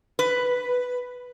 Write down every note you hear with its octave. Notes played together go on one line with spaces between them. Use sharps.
B4